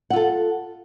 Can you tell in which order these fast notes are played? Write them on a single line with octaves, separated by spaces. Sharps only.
F#5 F4 A4